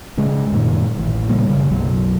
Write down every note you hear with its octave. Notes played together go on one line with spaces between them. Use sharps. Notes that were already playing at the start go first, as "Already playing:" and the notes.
G#2 C#3 G#3
F#2 A#2 D#3
A1 A2
A#2 C#3 G3 A#3
F#1 F2 C#3
B1 F#2 F#3